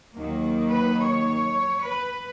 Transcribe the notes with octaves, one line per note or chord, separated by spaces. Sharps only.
D#2 D#3 F#3 A#3
B4
C#5
B4